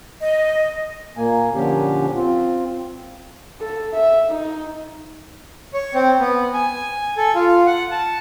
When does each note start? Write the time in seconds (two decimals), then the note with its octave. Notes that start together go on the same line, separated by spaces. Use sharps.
0.20 D#5
1.17 A#2 A#3 G#5
1.54 A#2 D3 F3 C#4 G4
2.16 C4 F4
3.61 A4
3.94 E5
4.30 D#4
5.74 C#5
5.94 C4
6.20 B3
6.54 G#5
7.17 A4
7.35 F4
7.66 F#5
7.91 A5